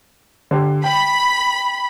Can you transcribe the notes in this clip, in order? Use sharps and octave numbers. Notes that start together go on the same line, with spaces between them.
D3 G4
G5 B5